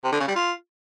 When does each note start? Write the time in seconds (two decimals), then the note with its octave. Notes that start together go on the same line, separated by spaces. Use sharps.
0.04 C3
0.12 D3
0.20 C#3
0.28 G3
0.36 F4